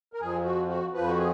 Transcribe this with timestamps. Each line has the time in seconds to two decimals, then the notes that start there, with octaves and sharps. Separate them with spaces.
0.13 A#4
0.20 F2 F3 G#4
0.44 F#4
0.69 F#4
0.93 F2 F3 B4
1.08 F#4
1.18 G#4